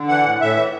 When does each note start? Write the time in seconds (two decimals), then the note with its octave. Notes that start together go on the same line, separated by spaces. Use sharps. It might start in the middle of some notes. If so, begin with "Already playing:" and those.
Already playing: D3
0.08 E3 F#5
0.24 A2
0.40 A2 E5
0.56 E3